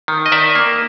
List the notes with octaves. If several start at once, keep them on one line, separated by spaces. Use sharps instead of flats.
D#3
D#5
D#3 D5 E5
A#3